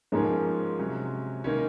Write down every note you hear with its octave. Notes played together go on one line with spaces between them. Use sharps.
G#2 F3 G#3 A#3 C#4 G#4
C3 F#3 C#4
D#3 A#3 C#4